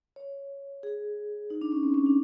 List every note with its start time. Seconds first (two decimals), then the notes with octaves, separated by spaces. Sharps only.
0.16 C#5
0.83 G#4
1.50 D#4
1.61 D4
1.72 C#4
1.83 C4
1.94 C#4
2.06 D4